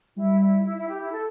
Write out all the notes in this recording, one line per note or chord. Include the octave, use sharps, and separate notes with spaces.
G3 E4
E4
E4
E4
G4
E4
A4